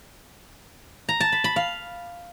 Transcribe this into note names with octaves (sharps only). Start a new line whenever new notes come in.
A#5
A5
B5
B5
F5